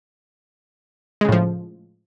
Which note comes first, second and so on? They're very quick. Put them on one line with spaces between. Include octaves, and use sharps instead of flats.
G#3 C#3 A2 F3